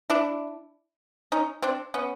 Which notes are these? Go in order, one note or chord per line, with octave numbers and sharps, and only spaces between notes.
D4 E4
C#4 D#4
C4 D4
B3 C#4